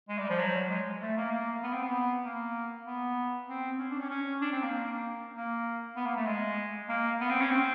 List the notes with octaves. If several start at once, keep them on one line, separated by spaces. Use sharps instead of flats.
G#3
G3
F3
F#3
G#3
A3
A#3
A#3
B3
C4
B3
A#3
B3
C4
C#4
D4
C#4
C#4
D4
C4
A#3
A#3
B3
A#3
A3
G#3
A#3
B3
C4
C#4
C4